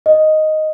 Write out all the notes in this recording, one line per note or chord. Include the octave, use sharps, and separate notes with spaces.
D#5